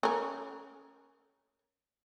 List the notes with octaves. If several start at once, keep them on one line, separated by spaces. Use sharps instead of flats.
C#4 A#4